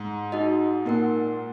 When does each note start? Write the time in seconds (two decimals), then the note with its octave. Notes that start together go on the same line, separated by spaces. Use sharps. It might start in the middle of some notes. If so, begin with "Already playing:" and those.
Already playing: G#2
0.32 D#4 F#4 D#5
0.85 A#2 D#4 A#4 F#5